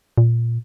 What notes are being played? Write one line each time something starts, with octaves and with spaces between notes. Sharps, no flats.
A#2